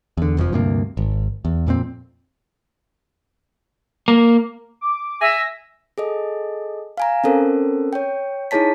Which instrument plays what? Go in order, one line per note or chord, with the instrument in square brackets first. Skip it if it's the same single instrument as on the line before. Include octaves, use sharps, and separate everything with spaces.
[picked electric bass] E2 D3
F1 F2 A2 F3
D2 G2 C3 A#3
G#1
E2
F2 A#2 A#3 C4
[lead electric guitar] A#3
[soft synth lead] D6
[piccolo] E5 [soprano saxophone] G#5 [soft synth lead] A#6
[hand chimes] G#4 A4 D#5
F5 G#5 A#5
C4 C#4 A4 A#4 C5
C#5 G5
D#4 E4 G#4 C#5 A5 B6